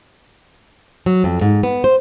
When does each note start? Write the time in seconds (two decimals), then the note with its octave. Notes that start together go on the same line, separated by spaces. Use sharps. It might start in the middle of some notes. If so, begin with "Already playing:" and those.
1.06 F#3
1.24 F2
1.41 G#2
1.63 B3
1.84 C5